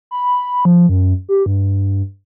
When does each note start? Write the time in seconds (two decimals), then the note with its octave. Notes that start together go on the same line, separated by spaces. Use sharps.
0.11 B5
0.65 F3
0.89 F#2
1.29 G4
1.46 G2